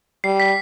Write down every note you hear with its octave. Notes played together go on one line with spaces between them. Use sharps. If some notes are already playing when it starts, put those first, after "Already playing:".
G3 C7
B6